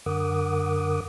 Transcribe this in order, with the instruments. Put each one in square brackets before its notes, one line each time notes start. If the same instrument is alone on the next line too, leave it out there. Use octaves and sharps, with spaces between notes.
[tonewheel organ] F#2 D3 A#4 F#5 D6 D#6